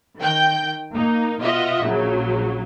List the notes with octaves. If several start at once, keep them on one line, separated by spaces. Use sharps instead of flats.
D#3 G5 G6
A#3 D#4
B2 F4 D#5 E5 F#5
A#1 C#3 F#3